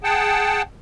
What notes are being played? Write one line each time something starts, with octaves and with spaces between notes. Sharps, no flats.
G#4 F#5 G5 A5